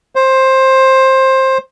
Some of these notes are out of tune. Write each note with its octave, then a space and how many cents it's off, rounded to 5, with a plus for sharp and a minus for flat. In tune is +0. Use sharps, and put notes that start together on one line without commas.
C5 +15